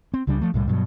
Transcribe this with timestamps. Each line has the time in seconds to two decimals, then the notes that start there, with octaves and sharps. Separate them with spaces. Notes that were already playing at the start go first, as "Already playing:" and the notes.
0.14 C4
0.27 C#2 C#3 G3 D4
0.41 F3 A3
0.54 C2 A2 G3
0.67 G2 B2 F#3